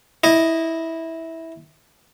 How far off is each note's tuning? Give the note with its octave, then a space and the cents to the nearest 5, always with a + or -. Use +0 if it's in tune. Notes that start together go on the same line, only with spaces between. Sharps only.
E4 -15 D#5 +0